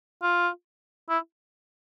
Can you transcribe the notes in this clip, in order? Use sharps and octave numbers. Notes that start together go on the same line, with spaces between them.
F4
E4